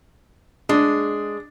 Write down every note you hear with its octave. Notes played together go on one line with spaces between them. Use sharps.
G#3 D4